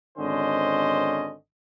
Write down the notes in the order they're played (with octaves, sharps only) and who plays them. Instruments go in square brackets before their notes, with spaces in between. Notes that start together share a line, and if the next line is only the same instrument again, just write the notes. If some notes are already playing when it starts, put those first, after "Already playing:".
[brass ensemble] G#1 D3 C#4 C5 D#5